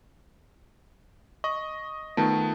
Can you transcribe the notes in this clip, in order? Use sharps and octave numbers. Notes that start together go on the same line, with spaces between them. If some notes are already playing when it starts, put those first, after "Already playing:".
D#5 C#6
D#3 A3 B3 F4 A5